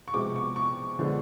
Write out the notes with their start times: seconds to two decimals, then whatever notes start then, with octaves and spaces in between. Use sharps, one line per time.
0.08 C#6
0.14 C3 F3 G#3 B3 D6
0.36 C#6
0.56 C#6
0.99 D3 F3 G#3 B3